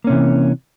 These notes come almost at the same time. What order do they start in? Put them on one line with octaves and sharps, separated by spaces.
A#3 C#4 C3 E3